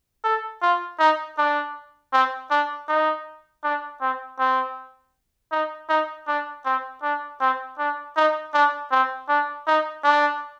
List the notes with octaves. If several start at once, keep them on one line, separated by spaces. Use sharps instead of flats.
A4
F4
D#4
D4
C4
D4
D#4
D4
C4
C4
D#4
D#4
D4
C4
D4
C4
D4
D#4
D4
C4
D4
D#4
D4